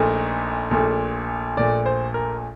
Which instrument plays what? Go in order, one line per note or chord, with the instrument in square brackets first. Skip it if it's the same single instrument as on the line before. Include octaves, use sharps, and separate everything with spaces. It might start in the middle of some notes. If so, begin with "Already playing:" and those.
Already playing: [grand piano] A#1 A#2 A3 D#4
A#1 A#2 A3
A#1 A#2 A3 D5
C5
A#4